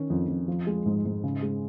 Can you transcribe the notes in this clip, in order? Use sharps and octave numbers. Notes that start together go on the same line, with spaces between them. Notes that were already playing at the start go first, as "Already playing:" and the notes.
Already playing: D#3 C#4
F2
F2
F3
G#3
G#2
G#2
C#3
G#3